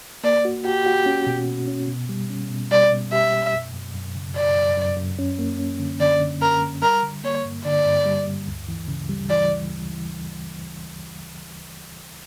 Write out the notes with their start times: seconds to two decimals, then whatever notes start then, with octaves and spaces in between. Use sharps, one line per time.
0.24 A#3 D5
0.45 F#4
0.65 F#4 G4
0.86 F#4
1.06 C#4
1.27 B2
1.48 B2
1.68 C#4
1.88 B2
2.09 G3
2.30 C#4
2.50 B2
2.72 G3 D5
2.91 B2
3.12 G4 E5
3.33 B2
3.54 F#2
3.73 F#2
3.94 F#2
4.16 C#3
4.36 F#2 D5
4.56 F#2
4.77 F#2
4.97 F#2
5.19 C#4
5.39 A#3
5.59 C#4
5.79 D3
6.00 D3 D5
6.21 D3
6.42 C#4 A#4
6.62 D3
6.83 G3 A#4
7.03 D3
7.24 A#3 C#5
7.45 G2
7.65 D3 D5
7.85 G2
8.06 G3
8.27 G2
8.48 D2
8.68 E3
8.88 C#3
9.09 G3
9.30 E3 D5
9.50 D2
9.70 D2
9.91 E3